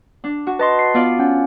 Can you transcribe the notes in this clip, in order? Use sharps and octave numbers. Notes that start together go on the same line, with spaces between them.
D4
F#4
B4 D#5 A5 C6
C7
B3 F4 D5
C#4 F#5